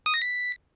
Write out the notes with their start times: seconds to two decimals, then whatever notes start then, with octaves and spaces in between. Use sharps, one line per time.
0.06 D#6
0.14 A#6
0.22 B6